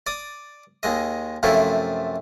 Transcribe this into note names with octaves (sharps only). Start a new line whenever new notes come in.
D5 D#6
D#2 G#3 D#5
F#2 C3 F3 A3 E4